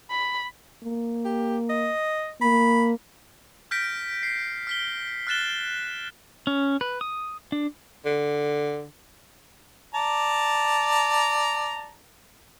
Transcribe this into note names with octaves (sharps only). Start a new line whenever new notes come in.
B5
A#3
G4
D#5
A#3 B5
F6 G6 A#6 B6 D7
C7
F6 B6 G7
F6 F#6 A6 E7 G7
C#4
B4
D#6
D4
D3
D5 A5 A#5